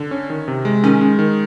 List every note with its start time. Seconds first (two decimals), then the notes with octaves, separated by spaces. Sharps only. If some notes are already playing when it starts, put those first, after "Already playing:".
Already playing: D3
0.11 C#4
0.30 D#3
0.48 C3
0.65 G#3
0.84 D#3 C#4
1.01 G#3
1.19 D#3